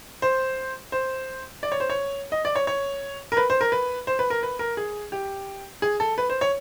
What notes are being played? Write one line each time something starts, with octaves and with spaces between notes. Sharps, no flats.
C5
C5
D5
C#5
C5
C#5
D#5
D5
C#5
C#5
A#4
B4
C5
A#4
B4
C5
B4
A#4
B4
A#4
G#4
G4
G#4
A4
B4
C5
C#5